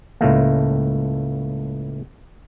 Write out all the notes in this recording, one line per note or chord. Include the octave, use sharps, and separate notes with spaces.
C#2 A2 A3 A#3